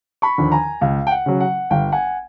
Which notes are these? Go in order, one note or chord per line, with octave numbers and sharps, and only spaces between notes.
B5 C#6
D#2 D3 F3
G#5 A#5
C#2 F5
G5
F#5
C#3 F#3
F#5
G1 F5 G5
F#5 G#5